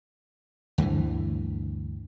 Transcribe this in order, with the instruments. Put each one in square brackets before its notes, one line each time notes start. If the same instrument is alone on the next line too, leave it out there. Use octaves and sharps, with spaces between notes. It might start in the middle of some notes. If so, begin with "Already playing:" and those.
[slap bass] D2 G2 D3 E3